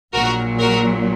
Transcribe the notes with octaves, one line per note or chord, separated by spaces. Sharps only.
A#1 A#2 F#3 F#4 A#4
F#4 A#4